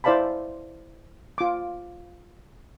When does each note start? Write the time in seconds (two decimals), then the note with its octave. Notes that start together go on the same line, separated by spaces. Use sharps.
0.04 E4 C5 D5 F5 A5 B5
1.38 F4 D6